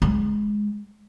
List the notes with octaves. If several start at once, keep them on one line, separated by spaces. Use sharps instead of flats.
G#3